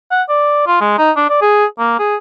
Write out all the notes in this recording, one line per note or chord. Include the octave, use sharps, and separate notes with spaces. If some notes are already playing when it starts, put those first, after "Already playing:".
F#5
D5
F4
G#3
D#4
D4
D5
G#4
A#3
G#4